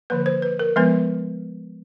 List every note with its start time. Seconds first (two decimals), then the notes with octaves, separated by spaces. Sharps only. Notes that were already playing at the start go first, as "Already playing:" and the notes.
0.10 D3 F3 A#3 B4
0.26 C5
0.42 B4
0.59 A#4
0.76 F3 G#3 B3 B4